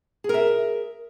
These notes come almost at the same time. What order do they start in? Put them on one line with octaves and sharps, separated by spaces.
G#4 A#4 E5